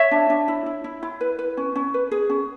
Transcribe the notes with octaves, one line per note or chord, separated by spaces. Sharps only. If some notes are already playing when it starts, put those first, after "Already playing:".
Already playing: C#5 E5
D4
D4
E4
E4
E4
E4
B4
B4
C#4
C#4
B4
G#4
C#4